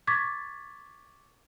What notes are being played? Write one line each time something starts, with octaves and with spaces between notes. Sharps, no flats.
C#6 D6 G#6 A6 B6